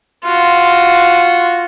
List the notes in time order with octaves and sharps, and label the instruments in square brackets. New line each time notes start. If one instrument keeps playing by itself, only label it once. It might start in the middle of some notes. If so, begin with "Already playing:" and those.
[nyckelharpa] F4 F#4